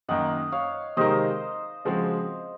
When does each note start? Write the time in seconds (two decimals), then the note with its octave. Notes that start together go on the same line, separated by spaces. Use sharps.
0.08 F#2 D#3 A#3 D#5 F#5
0.52 C#5 F5
0.97 C3 D#3 G#3 D#4 A#4 C5 D#5
1.85 C#3 F3 G#3 C4 F#4